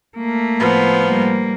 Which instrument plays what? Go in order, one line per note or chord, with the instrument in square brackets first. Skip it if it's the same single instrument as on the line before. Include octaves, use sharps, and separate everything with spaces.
[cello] A3 A#3
[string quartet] A2 F3 B3
[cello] G3 A#3